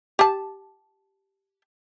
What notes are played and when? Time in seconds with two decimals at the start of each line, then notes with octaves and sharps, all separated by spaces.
0.19 G4 A5